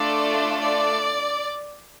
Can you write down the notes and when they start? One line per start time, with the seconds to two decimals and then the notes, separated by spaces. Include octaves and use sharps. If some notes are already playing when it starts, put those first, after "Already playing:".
Already playing: A3 D4 F4 A4 D5
0.61 D5